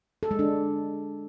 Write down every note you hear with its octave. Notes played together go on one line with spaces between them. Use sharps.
A4
G#3
D4